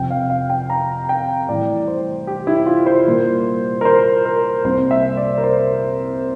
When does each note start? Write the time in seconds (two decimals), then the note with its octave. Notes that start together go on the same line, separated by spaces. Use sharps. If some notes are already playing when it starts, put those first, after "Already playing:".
Already playing: F2 C3 F3 G5
0.10 F5
0.30 F5
0.50 G5
0.70 A#5
1.09 G5
1.49 A2 E3 G3 D5
1.88 C5
2.27 G4
2.47 E4
2.66 F4
2.86 C5
3.07 A#2 G3 A#3
3.81 A#4
3.85 C5
4.25 A#4
4.64 C2 C3 G3 A#3 C5
4.91 E5
5.17 D5
5.38 A#4
5.43 C5